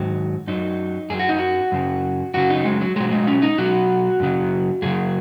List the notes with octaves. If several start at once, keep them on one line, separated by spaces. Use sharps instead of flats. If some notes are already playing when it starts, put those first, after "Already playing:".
Already playing: G#2 D#3 F#3
F#2 F#3 D#4
F#2 F#3 G#4
F#4
D#4
F#4
F#2 C#3 F#3
F#2 C#3 F#3 F#4
D#4
G#3
F#3
B2 F#3 G#3
G#3
C#4
D#4
B2 F#3 F#4
F#2 C#3 F#3
F#2 C#3 F#3 G#4